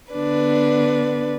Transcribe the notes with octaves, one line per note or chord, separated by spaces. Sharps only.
D3 B3 D4 B4